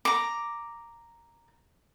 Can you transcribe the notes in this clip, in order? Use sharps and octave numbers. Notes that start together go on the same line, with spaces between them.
A#5 D6